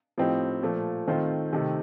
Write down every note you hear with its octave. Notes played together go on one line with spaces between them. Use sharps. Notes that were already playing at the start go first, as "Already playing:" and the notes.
A2 F3 C4 D#4 G4
A#2 F3 A3
D#3 A3 C4 F4 C5
C3 D#3 A3